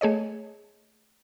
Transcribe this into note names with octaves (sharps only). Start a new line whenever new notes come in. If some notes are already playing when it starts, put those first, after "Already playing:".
A3 G#4 C#5 D#5